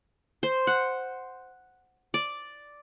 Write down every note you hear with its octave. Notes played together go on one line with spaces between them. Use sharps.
C5
F#5
D5